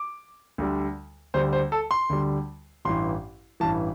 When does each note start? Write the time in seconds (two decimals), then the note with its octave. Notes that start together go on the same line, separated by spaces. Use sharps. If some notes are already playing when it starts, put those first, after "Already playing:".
Already playing: D6
0.58 D2 D3 G3
1.34 D2 D3 G3 C5
1.53 C5
1.72 A4
1.91 C6
2.09 D2 D3 G3
2.85 A1 G2 E3 C6
3.60 A1 G2 E3 A5